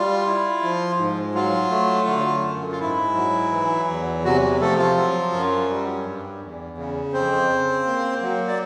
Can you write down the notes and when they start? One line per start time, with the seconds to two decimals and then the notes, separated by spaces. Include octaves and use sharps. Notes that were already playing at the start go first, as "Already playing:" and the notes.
Already playing: G3 F4
0.27 E4
0.63 F3
0.98 G#2
1.35 F#3 F4
1.70 A3
2.08 D3
2.43 F#2
2.72 F4
2.80 G#2 E4
3.15 F#3
3.52 E3
3.88 E2
4.24 C3 F#3 F#4
4.60 F3 A3 A4
4.78 F4
4.96 F#3
5.33 F#2
5.69 G3
6.04 G2
6.42 E2
6.78 C#3
7.13 F2 C4 C5
7.49 C#3
7.86 A#3
8.22 F#3
8.48 D5